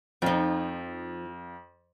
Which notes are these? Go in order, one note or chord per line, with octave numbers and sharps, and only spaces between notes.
F2 F3 D#4